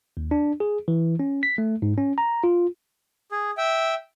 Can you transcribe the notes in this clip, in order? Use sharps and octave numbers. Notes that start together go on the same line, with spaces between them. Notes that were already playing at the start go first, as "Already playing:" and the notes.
D#2
D4
G#4
E3
C#4
B6
A3
G#2
C#4
A#5
F4
G#4
E5 G5